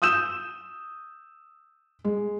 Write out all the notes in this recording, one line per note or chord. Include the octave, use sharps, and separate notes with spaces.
D#6 E6 G6 E7
G#3